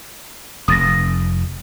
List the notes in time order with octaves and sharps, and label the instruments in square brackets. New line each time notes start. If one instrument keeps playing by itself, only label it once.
[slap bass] F1 [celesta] D#6 A6 A#6